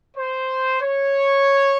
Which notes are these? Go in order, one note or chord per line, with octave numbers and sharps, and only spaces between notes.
C5
C#5